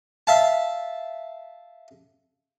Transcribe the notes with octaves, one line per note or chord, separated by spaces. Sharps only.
E5 F5 A5